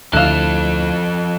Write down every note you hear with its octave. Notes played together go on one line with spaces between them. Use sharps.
D2 D3 F3 E4 F4 A4 F#6 E7